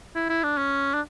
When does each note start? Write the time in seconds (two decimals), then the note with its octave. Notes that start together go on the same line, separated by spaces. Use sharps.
0.15 E4
0.29 E4
0.43 D4
0.57 C#4
0.94 D4